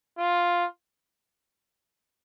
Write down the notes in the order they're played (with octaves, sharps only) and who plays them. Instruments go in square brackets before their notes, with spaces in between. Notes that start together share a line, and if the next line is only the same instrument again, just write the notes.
[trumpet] F4